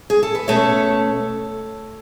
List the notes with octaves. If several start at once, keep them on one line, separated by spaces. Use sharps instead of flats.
G#4
A4
B4
B2 A3 C#4 A4 C#5